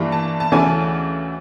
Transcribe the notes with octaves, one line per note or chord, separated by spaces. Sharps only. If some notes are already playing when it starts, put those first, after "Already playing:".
Already playing: G2 E3 G3 A#3
A5
A5
D2 C#3 E3 A3 G#5